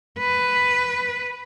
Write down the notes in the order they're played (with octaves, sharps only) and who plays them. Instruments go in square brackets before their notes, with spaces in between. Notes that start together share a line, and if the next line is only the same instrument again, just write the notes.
[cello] B4